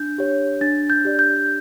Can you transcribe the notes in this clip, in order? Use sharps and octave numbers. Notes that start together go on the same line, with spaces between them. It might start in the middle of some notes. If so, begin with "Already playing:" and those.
Already playing: D4 G6
G4 C#5
D4 A6
G6
G4 D5
G6